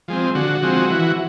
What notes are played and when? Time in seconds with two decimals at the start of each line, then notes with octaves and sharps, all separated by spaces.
0.08 F3 G#3 C4
0.35 D3 F#4
0.63 F3 G#3 C4
0.90 E3